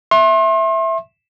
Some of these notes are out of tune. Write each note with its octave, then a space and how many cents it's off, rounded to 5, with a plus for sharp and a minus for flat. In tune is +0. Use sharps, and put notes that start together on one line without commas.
E5 +0 C6 +40